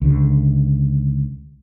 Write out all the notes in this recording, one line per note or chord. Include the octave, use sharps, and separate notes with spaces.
C#2 D3